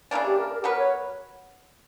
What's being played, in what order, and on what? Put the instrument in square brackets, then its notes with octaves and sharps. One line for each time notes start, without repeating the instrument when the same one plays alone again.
[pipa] C#3 E3 A#3 D4 [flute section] D5
[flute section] G4
A#4
A#4
G4
[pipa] F#3 B3 F#4 B4 [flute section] A#4
[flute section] C#5